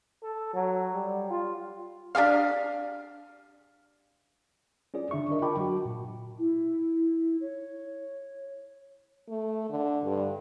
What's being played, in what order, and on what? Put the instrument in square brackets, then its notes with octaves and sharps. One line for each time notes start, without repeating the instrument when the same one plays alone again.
[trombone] A4
F#3
G3
F4
[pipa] D4 G4 G#4 F5
[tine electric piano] C#4 F4 G#4 D5
D3 D4 E5 C#6
D4 A#4 D#5
F4 A#4 G5 A5 B5 D6
F#3 F#4
A#2
[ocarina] E4
C#5
[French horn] A3
D3
G2